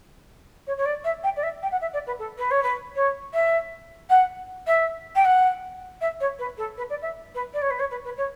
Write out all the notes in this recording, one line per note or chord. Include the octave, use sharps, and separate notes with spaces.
C#5
C#5
D5
E5
G5
D5
E5
G5
F#5
E5
D5
B4
A4
B4
C#5
B4
C#5
E5
F#5
E5
G5
F#5
E5
C#5
B4
A4
B4
D5
E5
B4
D5
C#5
B4
C#5
B4
B4
C#5